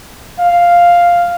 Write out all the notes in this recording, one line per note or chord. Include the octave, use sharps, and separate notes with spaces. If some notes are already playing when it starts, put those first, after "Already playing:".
F5